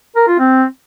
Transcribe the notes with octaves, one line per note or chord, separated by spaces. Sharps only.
A#4
F4
C4